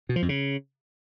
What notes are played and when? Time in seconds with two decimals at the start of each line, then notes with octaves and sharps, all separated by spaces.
0.09 B2
0.16 F3
0.22 F2
0.29 C#3